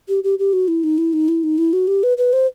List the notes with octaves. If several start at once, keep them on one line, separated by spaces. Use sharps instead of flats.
G4
G4
G4
F#4
E4
D#4
E4
D#4
E4
D#4
E4
F#4
G4
B4
B4
C5